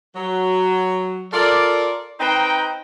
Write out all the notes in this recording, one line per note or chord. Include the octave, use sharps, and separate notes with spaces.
F#3
F4 A4 A#4 D5
C4 D#4 B4 C5 G5 A#5